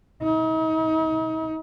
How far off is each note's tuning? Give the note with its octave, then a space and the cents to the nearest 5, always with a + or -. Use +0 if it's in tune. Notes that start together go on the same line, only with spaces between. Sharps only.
D#4 +40